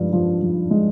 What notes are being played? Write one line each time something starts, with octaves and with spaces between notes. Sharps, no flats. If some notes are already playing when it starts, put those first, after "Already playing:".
Already playing: G2 F3 G#3
F3
F3
G#3